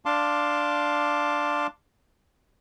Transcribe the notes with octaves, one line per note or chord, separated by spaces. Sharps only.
D4 F5 A5 C6 D6